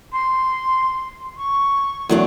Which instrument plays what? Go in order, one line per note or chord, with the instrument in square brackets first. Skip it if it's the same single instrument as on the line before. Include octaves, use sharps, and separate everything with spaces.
[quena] C6
C#6
[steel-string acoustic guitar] E2 F#3 D4